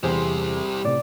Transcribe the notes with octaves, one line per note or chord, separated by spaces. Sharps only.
E2 C3 G3 C4 G#4 C5
A2 C3 D5